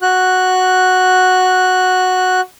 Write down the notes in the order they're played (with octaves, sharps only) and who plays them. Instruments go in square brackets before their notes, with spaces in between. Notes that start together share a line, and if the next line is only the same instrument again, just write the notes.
[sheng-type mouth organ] F#4 F#6